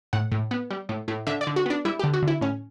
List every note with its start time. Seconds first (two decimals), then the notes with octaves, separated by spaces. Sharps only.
0.13 A2 F#5
0.32 A2
0.51 B3
0.71 G3
0.89 A2
1.08 A2
1.27 D3 E5
1.41 D5
1.47 D3
1.56 F#4
1.66 B3 D4
1.85 G3 E4
1.99 D3 G4
2.13 F#4
2.23 D3
2.28 E4
2.41 A2 C#4